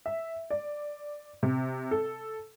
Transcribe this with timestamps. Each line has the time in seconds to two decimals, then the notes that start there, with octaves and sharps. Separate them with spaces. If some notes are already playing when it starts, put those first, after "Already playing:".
0.06 E5
0.50 D5
1.43 C3
1.91 A4